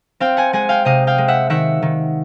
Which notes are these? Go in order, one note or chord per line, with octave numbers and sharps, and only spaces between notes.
C4 F5 G5
F#5 G#5
G#3 F#5 G#5
F5 G5
C3 D#5 F5
F5 G5
G#3
E5 F#5
D#3 E5 F#5
D#3